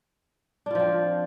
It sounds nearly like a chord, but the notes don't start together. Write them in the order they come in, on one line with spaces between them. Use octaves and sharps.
D4 F4 F3 C4